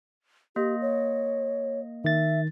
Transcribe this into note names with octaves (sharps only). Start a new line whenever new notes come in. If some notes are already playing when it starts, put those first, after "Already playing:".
A#3 G4 D#5
C#5
D#3 E5 A6